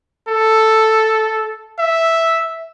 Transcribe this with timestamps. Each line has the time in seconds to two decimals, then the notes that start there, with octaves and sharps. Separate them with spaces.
0.28 A4
1.79 E5